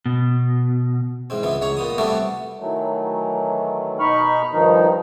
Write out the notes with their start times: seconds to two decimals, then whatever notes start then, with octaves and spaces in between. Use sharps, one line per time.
0.06 B2
1.30 E2 G#2 C4
1.43 C#2 E3 B3
1.61 C#2 C#5 A#5
1.77 A#2 B3 D#6
1.98 C3 G3 A3 B3 F#4 A4
2.60 D#3 E3 F#3 A3
3.99 B2 D#4 B5 C#6 F6
4.53 G2 D#3 F3 D#4